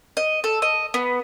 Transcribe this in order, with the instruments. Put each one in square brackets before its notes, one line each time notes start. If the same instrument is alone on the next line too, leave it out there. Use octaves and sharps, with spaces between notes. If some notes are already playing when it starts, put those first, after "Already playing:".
[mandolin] D#5
A4
D#5
B3